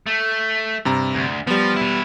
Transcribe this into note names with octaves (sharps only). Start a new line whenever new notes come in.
A3
G2 C3 A#5
D2
F3 G3 B3
B2 E4